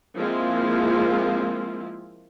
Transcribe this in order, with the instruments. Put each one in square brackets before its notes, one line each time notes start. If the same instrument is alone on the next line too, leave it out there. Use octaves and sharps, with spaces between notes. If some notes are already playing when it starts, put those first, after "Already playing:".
[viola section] F3 G#3 A#3 C4 E4 F4